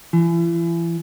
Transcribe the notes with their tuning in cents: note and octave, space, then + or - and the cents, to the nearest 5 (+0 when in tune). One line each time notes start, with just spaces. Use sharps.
E3 +35